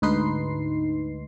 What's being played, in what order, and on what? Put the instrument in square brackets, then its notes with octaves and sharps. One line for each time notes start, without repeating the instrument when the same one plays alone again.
[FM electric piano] D2 G#2 D#4 B4 C6 C7